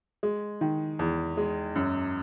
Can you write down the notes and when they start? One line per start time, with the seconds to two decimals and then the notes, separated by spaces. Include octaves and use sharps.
0.23 G#3
0.61 D#3
0.99 E2
1.37 G#3
1.76 F#2